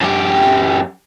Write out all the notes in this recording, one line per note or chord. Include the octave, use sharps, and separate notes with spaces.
F#2 G4